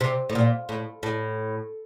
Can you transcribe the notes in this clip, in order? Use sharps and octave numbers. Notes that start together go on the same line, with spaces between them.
C3
A2
A#2
A2
A2